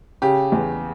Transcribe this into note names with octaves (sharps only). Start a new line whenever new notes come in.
C#3 G4
E2